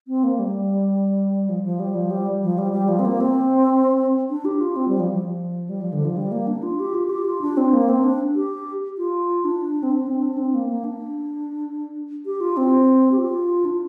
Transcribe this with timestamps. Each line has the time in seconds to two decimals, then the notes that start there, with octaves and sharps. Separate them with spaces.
0.08 C4
0.24 A#3
0.39 G3
1.49 F3
1.64 F3
1.80 G3
1.95 F3
2.11 G3
2.43 F3
2.58 G3
2.73 G3
2.88 F3
2.99 C4
3.05 A#3
3.20 C4
4.30 D4
4.45 G4
4.61 F4
4.76 C4
4.88 G3
5.00 F3
5.11 F3
5.69 G3
5.81 F3
5.93 D3
6.05 F3
6.17 G3
6.32 A#3
6.47 D4
6.63 F4
6.80 G4
6.94 F4
7.10 G4
7.25 F4
7.41 D4
7.57 C4
7.73 A#3
7.89 C4
8.04 D4
8.35 G4
8.98 F4
9.45 D4
9.83 C4
9.92 D4
10.07 C4
10.23 D4
10.38 C4
10.54 A#3
10.69 A#3
10.84 D4
12.26 G4
12.41 F4
12.57 C4
13.12 G4
13.18 F4
13.65 D4